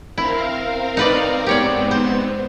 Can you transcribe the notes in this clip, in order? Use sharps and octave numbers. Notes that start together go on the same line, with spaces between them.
C4 E4 A#4 F5
D#4 B4 D5
G#2 B3 C4 G4 C#5 D5
C5